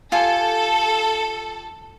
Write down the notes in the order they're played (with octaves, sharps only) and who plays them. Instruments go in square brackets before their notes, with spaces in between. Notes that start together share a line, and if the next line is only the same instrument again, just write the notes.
[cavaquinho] F4 G4 G#5 [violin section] A4